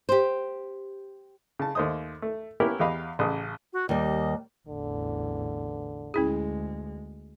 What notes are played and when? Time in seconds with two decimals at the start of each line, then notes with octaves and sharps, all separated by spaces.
0.09 G4 C5
1.59 C#3 A5
1.75 D#2 A3 C5 D#5 D#6
2.22 A3
2.60 A#3 B3 C#4 E4 G4 A#4
2.80 E2 G4 D#5 F5 B5
3.19 A1 C#3 D#6
3.73 F#4
3.89 D#2 G3 D#5
4.68 A1 E2 D3
6.14 D2 G#3 C#4 E4 G#4